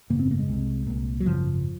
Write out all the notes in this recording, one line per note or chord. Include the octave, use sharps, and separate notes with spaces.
G#1 F#2 C#3 A#3
C4
A#3
G#3
C2 C3
C2 A#2
F#3
G#1 F#2 C#3 F3